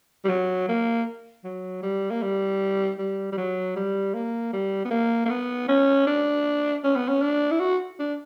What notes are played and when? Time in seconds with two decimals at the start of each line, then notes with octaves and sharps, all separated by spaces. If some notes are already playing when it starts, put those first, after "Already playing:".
0.25 G3
0.29 F#3
0.68 A#3
1.44 F#3
1.83 G3
2.10 A#3
2.22 G3
2.98 G3
3.32 G3
3.37 F#3
3.76 G3
4.14 A#3
4.53 G3
4.85 B3
4.91 A#3
5.26 A#3
5.30 B3
5.68 C#4
6.07 D4
6.84 C#4
6.96 B3
7.08 C#4
7.22 D4
7.51 E4
7.60 F#4
8.00 D4